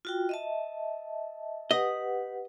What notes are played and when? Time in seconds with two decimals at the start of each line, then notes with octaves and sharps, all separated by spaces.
0.05 F4 F#4 G5
0.29 D#5 E5 A5
1.71 G4 B4 D#5 F#5